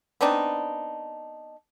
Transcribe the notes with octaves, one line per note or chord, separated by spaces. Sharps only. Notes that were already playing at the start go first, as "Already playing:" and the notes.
B3 C4 D4 D#4